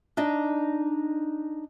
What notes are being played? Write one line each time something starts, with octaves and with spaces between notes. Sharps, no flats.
D4 D#4 D5 D#5